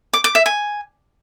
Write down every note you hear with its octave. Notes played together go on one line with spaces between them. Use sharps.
D6
D6
E5
G#5